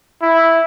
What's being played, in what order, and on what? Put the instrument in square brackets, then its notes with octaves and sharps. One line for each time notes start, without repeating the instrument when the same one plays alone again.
[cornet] E4